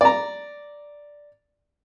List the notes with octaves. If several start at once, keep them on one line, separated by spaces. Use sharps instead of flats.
D5 A#5